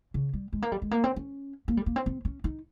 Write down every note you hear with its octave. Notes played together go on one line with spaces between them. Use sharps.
C#3
G3
G#3
A#3
G3
G#3
A#3
C4
C#4
A#3
G3
A#3
C4
C4
C#4
D#4